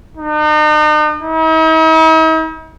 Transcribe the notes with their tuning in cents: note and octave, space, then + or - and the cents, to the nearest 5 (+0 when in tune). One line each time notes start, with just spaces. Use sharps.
D#4 -40
D#4 +45